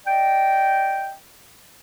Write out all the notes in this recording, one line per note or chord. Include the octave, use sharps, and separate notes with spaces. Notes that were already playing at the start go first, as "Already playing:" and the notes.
D5 D#5 G5